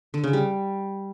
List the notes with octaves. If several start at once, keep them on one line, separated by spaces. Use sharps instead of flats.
D3
C#3
G3